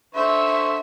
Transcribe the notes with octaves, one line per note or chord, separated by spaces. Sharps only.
D3 C5 E5 C#6